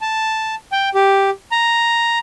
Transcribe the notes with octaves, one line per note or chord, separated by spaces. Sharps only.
A5
G5
G4
A#5